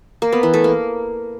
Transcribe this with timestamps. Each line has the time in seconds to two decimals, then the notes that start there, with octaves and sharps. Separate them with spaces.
0.22 A#3
0.32 B3
0.43 E3
0.54 A3
0.64 A#3